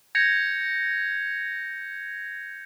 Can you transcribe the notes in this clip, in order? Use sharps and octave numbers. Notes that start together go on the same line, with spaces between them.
G6 G#6 A#6 C#7 F7